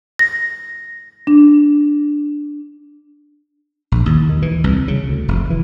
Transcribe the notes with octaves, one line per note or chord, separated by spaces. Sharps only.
A#6
D4
A#1
D#2
D#3
E3
C2
C#3
D2
F1
E3